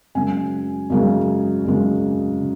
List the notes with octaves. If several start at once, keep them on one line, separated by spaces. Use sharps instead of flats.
F#2 C#3 G#3 G#5
F#2 C#3 G#3
F#2 C#3 G#3
C#3